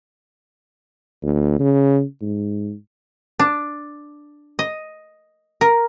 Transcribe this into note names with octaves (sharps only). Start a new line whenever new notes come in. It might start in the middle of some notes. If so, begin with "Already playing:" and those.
D2
C#3
G#2
D4
D#5
A#4